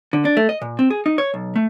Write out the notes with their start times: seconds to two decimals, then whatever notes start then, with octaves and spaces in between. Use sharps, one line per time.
0.13 D3
0.25 D4
0.37 A3
0.49 D#5
0.62 A#2
0.79 C4
0.90 G#4
1.06 D#4
1.18 C#5
1.34 B1
1.56 A3